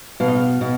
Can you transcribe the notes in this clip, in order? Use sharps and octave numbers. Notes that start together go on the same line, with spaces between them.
B2 F5
D#5
F5
B2